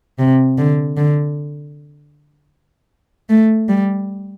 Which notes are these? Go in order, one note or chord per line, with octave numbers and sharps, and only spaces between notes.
C3
D3
D3
A3
G3